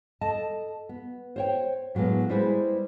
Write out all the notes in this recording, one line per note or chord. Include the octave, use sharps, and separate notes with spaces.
A4 D#5 A5
B3
C5 C#5 G5
A2 F#3 G#3 A#3 B3
G3 G#3 E4 G#4 B4 C5